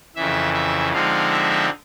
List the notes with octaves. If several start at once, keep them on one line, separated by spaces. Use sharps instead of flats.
F2 C#3 E3 E5
E5
D3 F3 G#3 C4 D#4 F5
E5